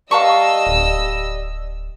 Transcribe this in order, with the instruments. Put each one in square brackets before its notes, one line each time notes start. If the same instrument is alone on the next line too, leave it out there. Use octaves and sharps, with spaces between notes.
[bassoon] G3 [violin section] D#5 E6 [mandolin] F5 A5 C#6
[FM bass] D1